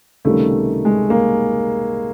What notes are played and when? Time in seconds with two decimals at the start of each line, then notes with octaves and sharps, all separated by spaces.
0.25 C#2 C3 D#3 G3 A3
0.85 G#3
1.10 A#3